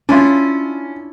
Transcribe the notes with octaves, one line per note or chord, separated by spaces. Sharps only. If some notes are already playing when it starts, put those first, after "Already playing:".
C#4 D4 E4 F4